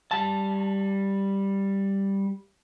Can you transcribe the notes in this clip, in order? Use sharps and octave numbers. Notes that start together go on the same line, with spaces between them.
G3 A5